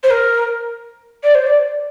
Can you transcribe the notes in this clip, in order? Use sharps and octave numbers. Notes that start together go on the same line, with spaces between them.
C5
A#4
D5
C5
D5